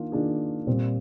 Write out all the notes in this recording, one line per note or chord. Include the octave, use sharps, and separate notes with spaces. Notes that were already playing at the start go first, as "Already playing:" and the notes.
Already playing: D#3 A#3 D4 F4
D#3 A#3 D4 F4 G#4
A#2 G3 C4